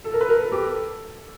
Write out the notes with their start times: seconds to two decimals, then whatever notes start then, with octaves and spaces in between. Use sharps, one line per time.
0.05 A4
0.13 A#4
0.21 B4
0.29 A#4
0.41 A4
0.52 G4
0.63 A4